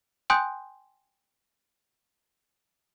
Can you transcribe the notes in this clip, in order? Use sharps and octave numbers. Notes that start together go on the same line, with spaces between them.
G5 G#5 C6 D#6 F#6 G6